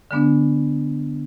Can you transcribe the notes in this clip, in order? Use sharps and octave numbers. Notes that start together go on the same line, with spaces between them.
D3 G#3 B3 D4